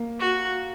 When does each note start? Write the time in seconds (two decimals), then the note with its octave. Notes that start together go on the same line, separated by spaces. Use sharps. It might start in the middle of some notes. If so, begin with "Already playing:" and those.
Already playing: A#3
0.20 F#4